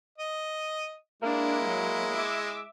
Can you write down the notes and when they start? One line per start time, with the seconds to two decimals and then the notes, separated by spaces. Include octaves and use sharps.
0.18 D#5
1.23 G#3 A#3 D4 E4
1.63 F#3
2.14 E5 D6